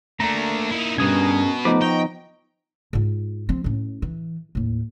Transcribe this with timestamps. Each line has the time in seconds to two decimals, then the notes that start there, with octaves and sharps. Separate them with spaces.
0.20 A3 A#3 D4 A#5
0.70 D#4 E4
0.98 G2 B2 C#4 G#4 A#4 D#6 G#6
1.65 F3 A3 B3 D#4 B4 D6
1.82 D#5 G5 A#5 C#6
2.93 G#2 F4
3.49 F3 C4
3.64 A2 C#4
4.02 E3
4.55 D#2 A2